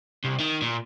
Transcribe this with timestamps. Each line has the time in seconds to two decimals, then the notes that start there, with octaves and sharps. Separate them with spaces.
0.25 C2
0.40 D#3
0.62 A#2